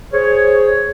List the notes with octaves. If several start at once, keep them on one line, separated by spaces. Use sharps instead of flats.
G#4 C5 C#5